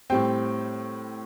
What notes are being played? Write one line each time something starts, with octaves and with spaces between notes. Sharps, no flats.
A2 G3 C4 G5